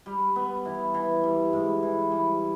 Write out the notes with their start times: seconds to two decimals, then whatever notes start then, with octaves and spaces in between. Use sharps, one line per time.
0.06 G3
0.36 B3
0.65 E3
0.94 E3
1.24 G3
1.53 G#2
1.83 E3
2.12 G3